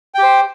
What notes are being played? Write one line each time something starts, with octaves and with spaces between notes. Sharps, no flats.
G4 C5 G5